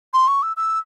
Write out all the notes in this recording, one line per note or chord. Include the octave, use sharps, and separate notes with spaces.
C6
C#6
E6
E6